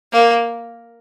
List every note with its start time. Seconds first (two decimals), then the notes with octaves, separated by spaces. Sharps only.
0.13 A#3